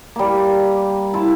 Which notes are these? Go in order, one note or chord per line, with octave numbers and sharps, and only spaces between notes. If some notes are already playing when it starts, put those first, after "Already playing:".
G3 A#3
E4 F4 A5